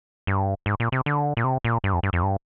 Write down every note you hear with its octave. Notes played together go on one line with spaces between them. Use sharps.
G2
G#2
A#2
C3
D3
A#2
C3
A#2
G2
F2
G2
F2
G2